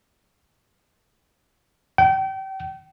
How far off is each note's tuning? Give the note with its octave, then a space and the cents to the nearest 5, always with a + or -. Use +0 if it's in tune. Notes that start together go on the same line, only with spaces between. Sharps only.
G5 -30